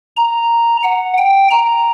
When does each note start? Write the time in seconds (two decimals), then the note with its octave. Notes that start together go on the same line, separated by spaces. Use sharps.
0.17 A#5
0.83 F#5
1.17 G5
1.51 A#5